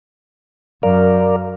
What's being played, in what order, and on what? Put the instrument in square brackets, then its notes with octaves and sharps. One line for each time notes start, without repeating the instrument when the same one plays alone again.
[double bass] F#2 [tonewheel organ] A#4 D5 F5